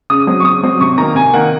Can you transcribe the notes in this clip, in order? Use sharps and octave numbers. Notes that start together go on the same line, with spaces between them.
C#3 D#6
F#3 C4
C#6
C#3 D#6
F#3 C4
C3 C#6
D#3 A#3 A#5
C3 G#5
D#3 A#3 F#5